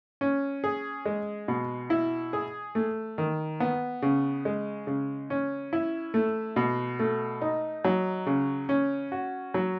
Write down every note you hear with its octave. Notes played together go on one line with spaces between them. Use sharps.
C#4
G#4
G#3
B2
E4
G#4
A3
D#3
B3
C#3
G#3
C#3
C#4
E4
A3
B2
A3
D#4
F#3
C#3
C#4
F#4
F#3